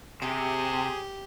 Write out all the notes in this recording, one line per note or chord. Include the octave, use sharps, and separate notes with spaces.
C3 G4 G#4